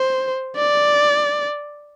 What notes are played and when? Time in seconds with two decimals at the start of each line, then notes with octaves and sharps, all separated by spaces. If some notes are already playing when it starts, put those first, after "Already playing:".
Already playing: C5
0.57 D5